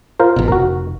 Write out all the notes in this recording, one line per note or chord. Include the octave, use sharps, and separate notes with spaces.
F4 A#4 C5
A1 B2
F1 F#4 A#4